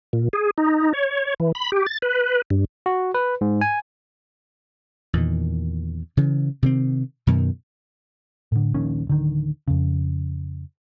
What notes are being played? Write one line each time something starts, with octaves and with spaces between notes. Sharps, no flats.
A#2
G#4
D#4
C#5
E3
B5
G4
A6
B4
G2
F#4
B4
G#2
G#5
E2 A#2 D#3
C#3 E3
C3 D#3 C4
F#2 B2 D#3
A2 D3
D#1 A#1 D#3 C#4
D1 D3 D#3
F2 C#3